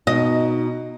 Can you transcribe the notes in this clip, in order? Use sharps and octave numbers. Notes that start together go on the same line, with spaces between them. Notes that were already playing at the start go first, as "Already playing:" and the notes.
B2 D#4 D#5